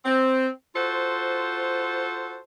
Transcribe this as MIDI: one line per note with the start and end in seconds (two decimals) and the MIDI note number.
0.05 0.48 60
0.75 2.37 65
0.75 2.37 66
0.75 2.37 69
0.75 2.37 72